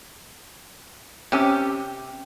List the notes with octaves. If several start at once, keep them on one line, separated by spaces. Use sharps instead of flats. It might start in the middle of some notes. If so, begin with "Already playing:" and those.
C3 C#4 G4